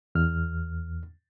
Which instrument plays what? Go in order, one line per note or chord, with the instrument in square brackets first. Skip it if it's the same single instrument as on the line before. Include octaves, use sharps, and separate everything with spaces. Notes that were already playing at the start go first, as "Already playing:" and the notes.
[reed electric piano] E2 F6